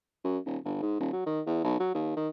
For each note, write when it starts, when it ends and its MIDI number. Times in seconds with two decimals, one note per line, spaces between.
0.25 0.38 42
0.46 0.58 27
0.65 0.80 31
0.82 0.95 44
1.00 1.10 27
1.13 1.24 54
1.26 1.41 51
1.46 1.60 40
1.64 1.75 35
1.80 1.93 54
1.95 2.15 39
2.17 2.28 51